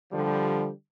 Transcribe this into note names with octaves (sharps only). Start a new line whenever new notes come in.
D3 F3 G3